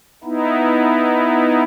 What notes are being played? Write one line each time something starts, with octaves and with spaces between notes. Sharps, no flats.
B3 D#4 E4